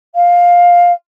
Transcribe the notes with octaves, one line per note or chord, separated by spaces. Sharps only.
F5